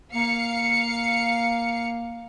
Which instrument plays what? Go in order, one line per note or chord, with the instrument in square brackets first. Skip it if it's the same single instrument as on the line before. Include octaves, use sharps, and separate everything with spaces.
[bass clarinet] A#3 [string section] F5 C#7